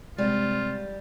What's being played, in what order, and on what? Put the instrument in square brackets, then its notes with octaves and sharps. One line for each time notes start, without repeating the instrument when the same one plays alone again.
[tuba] C3 [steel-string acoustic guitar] G3 [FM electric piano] G#3 [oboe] F4